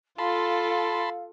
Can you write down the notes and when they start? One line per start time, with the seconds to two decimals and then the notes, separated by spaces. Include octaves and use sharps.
0.19 F4 A4 F5 A5 B5 C6